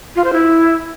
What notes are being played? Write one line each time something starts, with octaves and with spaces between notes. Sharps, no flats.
F4
C5
E4